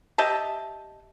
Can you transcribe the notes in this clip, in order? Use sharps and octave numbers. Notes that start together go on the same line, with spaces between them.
G4 D#5 E5 A5